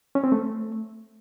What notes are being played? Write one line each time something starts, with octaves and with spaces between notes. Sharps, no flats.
C#4
C4
A3